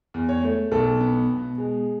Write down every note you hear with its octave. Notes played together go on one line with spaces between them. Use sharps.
E2
C#5
A3
B1 A4
B3
B2
G#3